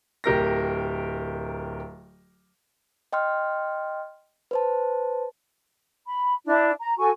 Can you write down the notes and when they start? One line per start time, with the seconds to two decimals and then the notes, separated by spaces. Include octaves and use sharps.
0.24 D1 G4 A#4 A#6
3.13 D#5 G5 C6 F6
4.51 B4 C5 A5
6.06 B5
6.45 D4 E4
6.78 A#5
6.98 F#4 A4 G#5 C#6